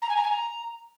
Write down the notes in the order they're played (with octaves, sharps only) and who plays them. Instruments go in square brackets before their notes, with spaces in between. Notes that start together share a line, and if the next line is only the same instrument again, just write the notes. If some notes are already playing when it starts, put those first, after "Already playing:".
[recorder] A#5
G#5
A#5
G#5
A#5